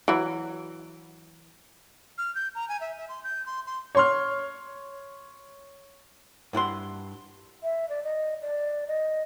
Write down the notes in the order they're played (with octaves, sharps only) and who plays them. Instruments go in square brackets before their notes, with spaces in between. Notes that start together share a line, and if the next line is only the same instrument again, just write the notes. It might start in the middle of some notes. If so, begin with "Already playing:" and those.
[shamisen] E3 F#3
[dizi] F6
G6
A#5
G#5
E5
E5
C6
G6
C6
C6
[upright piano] C#5 C6 F6
[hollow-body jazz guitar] G2 E4 F#5 C6
[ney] E5
D5
D#5
D5
D#5